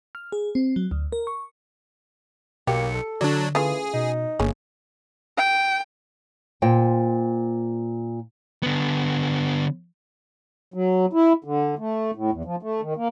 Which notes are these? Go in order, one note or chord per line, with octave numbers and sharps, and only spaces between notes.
F6
G#4
C4
F#3
D2
A#4
C#6
B1 A#3 G4 C#7
A4
D3 F#3 D4 D5
C#3 E3 A3 F4 G#4
B2 D#4
G1 G#3 A#3 C#4
G5
A#2 C5 G5
D3 B3
F#3
E4
D3
A3
A2
E2
F3
A3
D#3
A#3